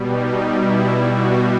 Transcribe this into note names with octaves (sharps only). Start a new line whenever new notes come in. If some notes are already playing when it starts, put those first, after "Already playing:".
Already playing: B2 G3
D#4
E4
F#4